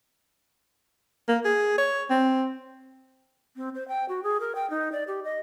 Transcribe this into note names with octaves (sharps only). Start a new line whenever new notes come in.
A#3
G#4
C#5
C4
C4
C5
G5
F#4
G#4
A#4
G5
D#4
D5
G4
D#5